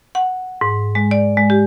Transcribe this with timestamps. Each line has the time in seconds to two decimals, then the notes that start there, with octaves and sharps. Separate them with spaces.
0.15 F#5
0.61 G#2
0.95 G#3
1.11 D5
1.37 G#3
1.50 G4